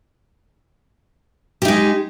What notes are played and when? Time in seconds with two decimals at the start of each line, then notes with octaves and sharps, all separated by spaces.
1.62 G4
1.65 D#4
1.68 G#3